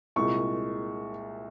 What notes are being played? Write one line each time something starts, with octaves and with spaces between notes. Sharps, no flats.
C2 A#2 G#3 C#6